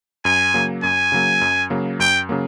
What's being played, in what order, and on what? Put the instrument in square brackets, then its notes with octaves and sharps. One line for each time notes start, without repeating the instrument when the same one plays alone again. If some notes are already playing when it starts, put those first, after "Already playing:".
[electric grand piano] F#2 [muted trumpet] G#5
[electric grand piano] C#3 F#3 A#3
[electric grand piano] F#2 [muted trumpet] G#5
[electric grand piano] C#3 F#3 A#3
F#2
C#3 F#3 A#3
[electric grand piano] F#2 [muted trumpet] G5
[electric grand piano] C#3 F#3 A#3